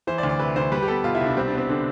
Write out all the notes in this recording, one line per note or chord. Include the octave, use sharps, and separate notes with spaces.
E3 C5
D5
D2
D5
C3 B4
D2 C5
G3 B4
G4
B3 A4
B2 F4
E4
C2
D4
G3 C4
D4
B3 C4
D3 D4